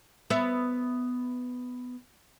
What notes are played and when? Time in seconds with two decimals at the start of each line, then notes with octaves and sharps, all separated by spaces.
0.30 B3 E5